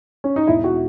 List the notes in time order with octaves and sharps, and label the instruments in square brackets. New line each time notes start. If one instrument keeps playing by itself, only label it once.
[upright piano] C#4
D#4
E1 E4
F#4